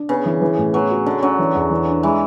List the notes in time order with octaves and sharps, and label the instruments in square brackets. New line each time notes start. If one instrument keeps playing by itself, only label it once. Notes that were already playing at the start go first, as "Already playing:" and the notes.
Already playing: [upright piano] D4
[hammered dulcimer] C#3 [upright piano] B3
[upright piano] E3
E3
A2
[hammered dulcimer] F#3 [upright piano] B3
[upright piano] F#4
[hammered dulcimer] D3 [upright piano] C#4
[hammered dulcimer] F#3 [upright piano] C#4
[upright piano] E3
E2
E3
D4
[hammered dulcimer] E3 [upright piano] G#3